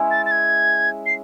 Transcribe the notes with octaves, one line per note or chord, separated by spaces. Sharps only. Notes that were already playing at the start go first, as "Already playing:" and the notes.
Already playing: G#3 C#4 E4
A6
A6
G#6
C7